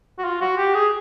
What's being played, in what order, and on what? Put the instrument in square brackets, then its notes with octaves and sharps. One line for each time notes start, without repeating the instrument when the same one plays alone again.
[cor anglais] F#4
F4
F#4
G4
G#4